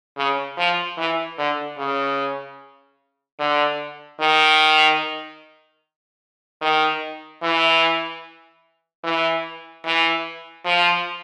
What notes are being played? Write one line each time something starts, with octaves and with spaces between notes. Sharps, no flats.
C#3
F3
E3
D3
C#3
D3
D#3
D#3
E3
E3
E3
F3